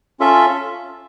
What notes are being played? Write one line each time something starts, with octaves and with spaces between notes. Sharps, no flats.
C#4 F4 A4 E5